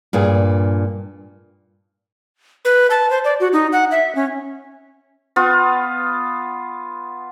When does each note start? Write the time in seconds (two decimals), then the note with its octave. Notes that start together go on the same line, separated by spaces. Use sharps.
0.13 G2 A#2 G#4
2.65 B4
2.91 A5
3.10 C5
3.24 D5
3.40 F#4
3.53 D#4
3.72 F#5
3.91 E5
4.15 C#4
5.36 B3 F4